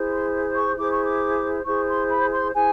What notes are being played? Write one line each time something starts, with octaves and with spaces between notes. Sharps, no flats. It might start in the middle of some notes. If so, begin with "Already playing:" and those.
Already playing: E4 G#4 C5
C6
C#6
E4 G#4 C5 D6
C#6
D6
E4 G#4 C5 C#6
C6
B5
C6
E4 G#4 C5 G#5